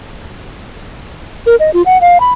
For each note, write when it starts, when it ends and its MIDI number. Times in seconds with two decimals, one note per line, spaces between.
1.46 1.56 70
1.60 1.70 75
1.74 1.82 65
1.86 2.00 78
2.01 2.18 77
2.20 2.33 83